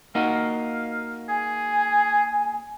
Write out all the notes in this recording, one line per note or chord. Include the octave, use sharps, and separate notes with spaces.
A#3 D#4 F#4 F5
G#4 G#5